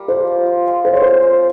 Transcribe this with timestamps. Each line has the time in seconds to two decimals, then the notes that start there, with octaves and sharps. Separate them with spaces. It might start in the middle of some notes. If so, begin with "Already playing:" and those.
Already playing: G3 A#3 A#4
0.08 F3 C5
0.27 F3
0.46 F4
0.66 G#3
0.85 C4 C5
0.93 C#5
1.02 C4 C5
1.23 G#3